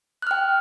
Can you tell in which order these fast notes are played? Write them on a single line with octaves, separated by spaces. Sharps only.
F#6 F6 G5